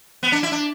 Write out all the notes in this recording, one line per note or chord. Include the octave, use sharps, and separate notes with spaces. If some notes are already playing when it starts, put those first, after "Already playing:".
B3
D4
E4
D4